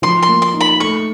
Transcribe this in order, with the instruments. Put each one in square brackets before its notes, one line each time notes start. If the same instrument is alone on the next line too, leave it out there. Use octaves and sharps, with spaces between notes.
[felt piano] F3 [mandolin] C6
[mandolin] C6
[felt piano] A#3
[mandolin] C6
[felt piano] D#4
[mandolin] B5
[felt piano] A3 [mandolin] C#6